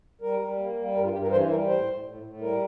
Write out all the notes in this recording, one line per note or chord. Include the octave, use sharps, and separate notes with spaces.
G3 A#4
G3
A#3
G3
G2 A#4
F4
G2 G4
A#4
E3 C5
G3 A#4
A2 C5
A2
A2
A2
G3 A#4